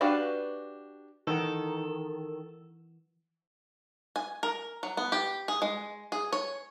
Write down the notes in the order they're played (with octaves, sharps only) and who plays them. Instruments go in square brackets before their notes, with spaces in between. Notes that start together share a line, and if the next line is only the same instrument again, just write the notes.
[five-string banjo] D4 F#4 G4 B4 F5
[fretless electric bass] D#3 [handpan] E3 F#5 [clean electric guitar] A4
[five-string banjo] G#5
A#4
F#3
B3
G4
G#4
G#3
G#4
C#5